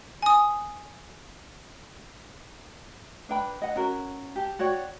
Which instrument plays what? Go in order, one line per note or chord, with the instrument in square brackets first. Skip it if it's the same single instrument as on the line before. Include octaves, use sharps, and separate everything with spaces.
[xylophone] G#5 D#6
[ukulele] D4 B4 G5 B5
D#5 F#5
C#4 F#4 A#4
G4 A5
F#4 C#5 D5 G5